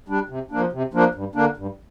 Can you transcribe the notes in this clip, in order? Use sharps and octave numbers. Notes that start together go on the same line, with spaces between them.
G3 D4
C3
F3 A#3 D4
C3
F3 A#3 D4
G2
D3 A#3 D4
G2